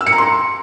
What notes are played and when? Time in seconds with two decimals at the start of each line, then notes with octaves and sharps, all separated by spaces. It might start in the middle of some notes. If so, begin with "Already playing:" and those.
0.01 E6
0.07 C#7
0.12 A#5
0.18 C6